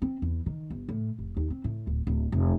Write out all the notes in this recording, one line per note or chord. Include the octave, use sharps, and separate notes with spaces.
C4
E2
D#3
G1
A2
F1
D#2
C4
A2
D1
D1
F1